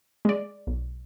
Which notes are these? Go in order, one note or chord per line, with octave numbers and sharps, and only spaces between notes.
G#3 D5
B1